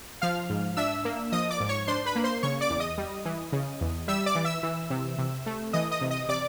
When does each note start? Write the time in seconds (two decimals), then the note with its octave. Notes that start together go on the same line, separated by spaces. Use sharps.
0.22 F3 F5 F6
0.49 G#2
0.77 D4 E5 E6
1.05 A#3
1.32 F3 D#5 D#6
1.50 D5 D6
1.60 G#2
1.69 C#5 C#6
1.87 D4 C5 C6
2.06 B4 B5
2.15 A#3
2.24 C5 C6
2.43 C#3 C#5 C#6
2.61 D5 D6
2.70 E2
2.80 D#5 D#6
2.98 G3
3.25 E3
3.52 C#3
3.81 E2
4.08 G3 E5 E6
4.26 D5 D6
4.35 E3
4.45 E5 E6
4.63 E3
4.90 C3
5.18 C3
5.46 A3
5.73 E3 D#5 D#6
5.91 D#5 D#6
6.01 C3
6.11 D#5 D#6
6.29 C3 D5 D6